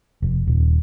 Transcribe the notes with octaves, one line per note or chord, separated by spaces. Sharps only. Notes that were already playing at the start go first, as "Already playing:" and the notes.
F1
D#1